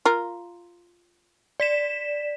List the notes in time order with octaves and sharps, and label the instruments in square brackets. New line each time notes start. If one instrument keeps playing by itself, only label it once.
[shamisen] F4 A#4
[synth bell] D5 B6 E7